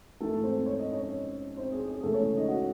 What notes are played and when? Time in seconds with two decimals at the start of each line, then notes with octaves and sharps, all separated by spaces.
0.20 G#2 E3 G#3 A3 A4
0.43 C4 C5
0.66 C#5
0.79 D#5
0.92 C#4 C#5
1.57 C4 C5
1.72 G#4
1.88 G#4
2.03 E2 C#3 G#3 A3 A4
2.14 C#4 C#5
2.36 D#4 D#5
2.48 F#4 F#5